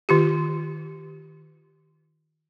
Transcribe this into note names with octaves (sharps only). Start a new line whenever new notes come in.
D#3 F4 G4